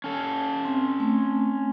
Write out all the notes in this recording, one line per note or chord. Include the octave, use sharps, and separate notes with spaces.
C#4 A4
C4
A3 C4